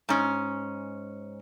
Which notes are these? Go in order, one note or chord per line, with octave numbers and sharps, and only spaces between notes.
G#2 C#4